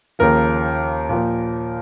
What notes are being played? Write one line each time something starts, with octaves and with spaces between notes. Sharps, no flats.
D#2 C#3 F3 A#4
A#2 F3 A#3